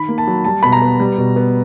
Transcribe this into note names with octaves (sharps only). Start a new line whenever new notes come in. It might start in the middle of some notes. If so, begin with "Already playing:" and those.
Already playing: D#3 B5
A#3
A5
F#3
G3 A5
B2 B5
A#5
B3
G3
B2
B3